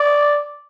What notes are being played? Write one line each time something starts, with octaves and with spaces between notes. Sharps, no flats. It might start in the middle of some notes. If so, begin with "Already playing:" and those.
Already playing: D5